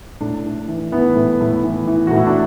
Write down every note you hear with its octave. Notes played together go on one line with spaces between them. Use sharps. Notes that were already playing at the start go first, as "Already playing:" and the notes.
A2 D4
A2
E3
E3 B3
A2
A2
E3
E3
A2 F#4
E4
D4